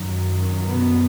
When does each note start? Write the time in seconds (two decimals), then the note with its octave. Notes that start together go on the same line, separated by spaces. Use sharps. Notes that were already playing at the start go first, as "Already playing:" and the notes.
Already playing: F#2 D#3 F#3
0.66 B2 B3